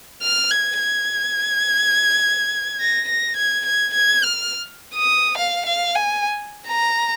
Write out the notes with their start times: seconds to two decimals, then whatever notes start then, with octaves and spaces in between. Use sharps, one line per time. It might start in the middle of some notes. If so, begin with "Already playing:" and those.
0.22 F6
0.51 G#6
0.79 G#6
2.80 A#6
3.09 A#6
3.37 G#6
3.66 G#6
3.94 G#6
4.23 F6
4.95 D#6
5.38 F5
5.66 F5
5.95 G#5
6.67 A#5